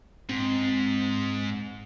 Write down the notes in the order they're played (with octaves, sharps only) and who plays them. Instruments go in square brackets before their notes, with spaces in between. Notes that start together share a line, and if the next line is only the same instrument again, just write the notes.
[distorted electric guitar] G#2 [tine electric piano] C4